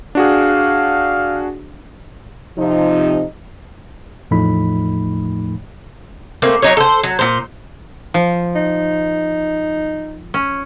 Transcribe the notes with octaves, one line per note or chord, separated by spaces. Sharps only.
D4 F#4 G#4 F5
C3 F3 D#4
E2 A2 F3 A3 D#4 B5
A3 A#3 C4
F#3 D#4 C#5
A4 C5
F#3
A#2 C5
F3
D#4
C#4